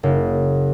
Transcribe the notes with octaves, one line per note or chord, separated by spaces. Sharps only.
F#1